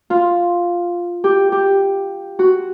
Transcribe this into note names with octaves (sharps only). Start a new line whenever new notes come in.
F4
G4
G4
F#4